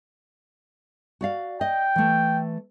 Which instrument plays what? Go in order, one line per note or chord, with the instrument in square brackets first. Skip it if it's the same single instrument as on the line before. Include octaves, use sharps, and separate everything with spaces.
[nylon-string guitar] F#4 D5 F5
[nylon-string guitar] D#5 [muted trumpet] G5
[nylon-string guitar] E3 A3